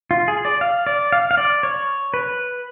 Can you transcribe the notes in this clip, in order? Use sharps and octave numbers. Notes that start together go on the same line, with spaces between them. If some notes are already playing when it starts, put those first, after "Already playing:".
F4
G#4
D5
F5
D5
F5
F5
D5
C#5
B4